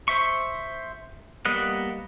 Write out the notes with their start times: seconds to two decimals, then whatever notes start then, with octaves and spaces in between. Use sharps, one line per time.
0.08 C5 E5 C#6
1.45 G3 A#3 B3 D#5 F#5